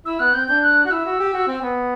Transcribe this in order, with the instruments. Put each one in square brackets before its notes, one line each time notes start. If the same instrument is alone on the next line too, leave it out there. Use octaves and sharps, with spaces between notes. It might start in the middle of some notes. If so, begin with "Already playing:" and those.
[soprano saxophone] E4 [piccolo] E6
[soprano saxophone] B3 [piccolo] F#6
[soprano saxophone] C4 [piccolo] G6
[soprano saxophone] D4 [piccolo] G6
[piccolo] F#6
[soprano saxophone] F#4 [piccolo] F#6
[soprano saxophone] E4 [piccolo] E6
[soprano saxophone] F#4
G4
F#4
C4
B3